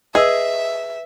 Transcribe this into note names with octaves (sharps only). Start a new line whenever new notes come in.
G#4 B4 D#5 E5 E6